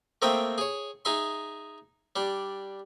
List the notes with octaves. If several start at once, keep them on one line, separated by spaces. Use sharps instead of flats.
A3 A#3 C4 D#5 E5 G5
G#4 C#5
D#4 G#4 E5 C6
G3 D4